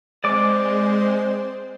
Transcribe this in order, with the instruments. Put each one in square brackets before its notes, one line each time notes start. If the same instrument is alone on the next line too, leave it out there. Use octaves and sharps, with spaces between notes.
[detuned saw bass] G#3 [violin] C4 C5 [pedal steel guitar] D5 D6